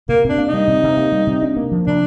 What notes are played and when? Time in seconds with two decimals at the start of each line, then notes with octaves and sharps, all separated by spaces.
0.09 C3 A#3
0.24 C3 D4
0.38 A#3
0.48 G3 D#4
0.68 C3
0.83 C3
0.97 A#3
1.12 G3
1.27 C3
1.43 D4
1.57 A#3
1.71 F3
1.86 C3 D4